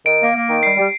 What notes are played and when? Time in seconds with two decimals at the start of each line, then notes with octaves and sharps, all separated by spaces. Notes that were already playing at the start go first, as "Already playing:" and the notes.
0.06 D#3 D7
0.21 A#3
0.35 A#3
0.49 D#3
0.63 G3 C7
0.77 G3